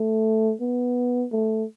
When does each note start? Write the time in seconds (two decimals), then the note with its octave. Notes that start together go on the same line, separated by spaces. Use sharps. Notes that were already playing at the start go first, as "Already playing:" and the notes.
Already playing: A3
0.61 B3
1.32 A3